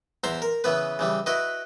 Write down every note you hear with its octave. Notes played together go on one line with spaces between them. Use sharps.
E2 C5 E5 A#5 C6
A#4
C#3 E3 B3 B4
C#3 E3 G3
E4 F#4 B4 D#5